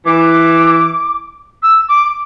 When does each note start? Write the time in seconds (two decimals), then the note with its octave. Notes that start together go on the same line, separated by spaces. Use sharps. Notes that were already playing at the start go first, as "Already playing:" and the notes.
0.05 E3 D6
1.63 E6
1.89 D6